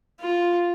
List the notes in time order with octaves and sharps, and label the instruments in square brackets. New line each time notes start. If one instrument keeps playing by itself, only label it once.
[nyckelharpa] F4